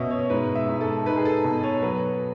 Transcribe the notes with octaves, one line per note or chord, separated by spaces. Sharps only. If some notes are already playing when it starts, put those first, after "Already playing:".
Already playing: B2 C#4 D#5 E5
C#5
G#2 B4
E5
G#2
A4
D#4 B4
G#4
A4
B2
C#5
F#3 B4